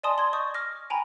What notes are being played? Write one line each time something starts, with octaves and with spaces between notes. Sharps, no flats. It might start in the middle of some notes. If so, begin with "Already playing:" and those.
D5 D#5 G#5 A5 C6 D#6
C6 G#6
D#5 C#6 D#6 G6 A6
D6 F6 A#6
G5 G#5 A#5 B5